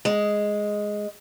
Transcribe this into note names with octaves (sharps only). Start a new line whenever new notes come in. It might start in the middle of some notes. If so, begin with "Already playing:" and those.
G#3